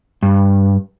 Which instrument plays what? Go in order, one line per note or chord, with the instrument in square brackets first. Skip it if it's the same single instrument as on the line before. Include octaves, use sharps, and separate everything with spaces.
[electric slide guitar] G2